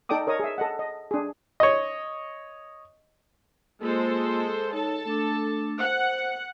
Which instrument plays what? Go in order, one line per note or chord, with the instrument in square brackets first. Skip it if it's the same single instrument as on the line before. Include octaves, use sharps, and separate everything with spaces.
[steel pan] D#4 A4 D5 G5 D6 D#6
A#4 C#5 D#5 D#6
G#4 E5
A4 D#5 F#5
D#5
D4 G#4
[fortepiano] C#5 D#5
[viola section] G#3 A4 C5 [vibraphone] A#3 F4
[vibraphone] D#4 C#5 [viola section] A4 A5
[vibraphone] A3 D4 D6
[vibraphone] C5 [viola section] F#5